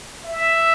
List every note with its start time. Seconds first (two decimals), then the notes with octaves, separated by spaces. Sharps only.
0.24 E5